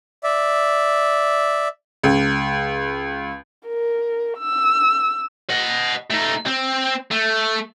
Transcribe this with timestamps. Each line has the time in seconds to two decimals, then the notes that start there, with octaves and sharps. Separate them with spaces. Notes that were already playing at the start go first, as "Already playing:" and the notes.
0.24 D5 E5
2.03 C#2
3.67 A#4
4.39 E6
5.50 D#5 F#5
6.11 A3 D#4
6.47 C4
7.11 A3